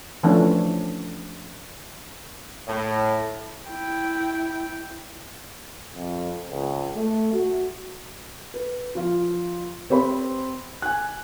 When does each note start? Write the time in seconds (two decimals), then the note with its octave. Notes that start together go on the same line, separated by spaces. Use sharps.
0.23 E3 F3 A3 C#4 D4
2.67 A2
3.68 E4 G5
5.95 F2
6.50 C#2
6.96 A3
7.33 F#4
8.54 B4
8.95 F3 F4
9.90 C4 G4 C5 B5
10.82 G#5 F#6